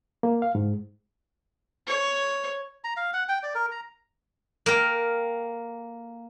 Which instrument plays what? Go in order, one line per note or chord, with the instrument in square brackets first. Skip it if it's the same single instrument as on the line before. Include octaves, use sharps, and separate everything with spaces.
[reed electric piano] A#3
F5
G#2
[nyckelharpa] C#5
[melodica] A#5
F5
F#5
G5
D5
A#4
A#5
[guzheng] A#3 A#4 G5